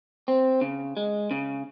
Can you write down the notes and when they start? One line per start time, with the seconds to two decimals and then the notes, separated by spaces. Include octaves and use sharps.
0.28 C4
0.61 C#3
0.97 G#3
1.31 C#3